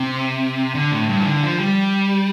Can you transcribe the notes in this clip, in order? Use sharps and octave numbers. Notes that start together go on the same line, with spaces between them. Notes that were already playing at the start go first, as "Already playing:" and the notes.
Already playing: C3
D3
A2
G2
E3
D3
F3
G3